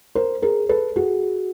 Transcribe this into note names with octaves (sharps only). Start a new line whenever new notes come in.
A#4 C5
G#4 A#4
A4 B4
F#4 G#4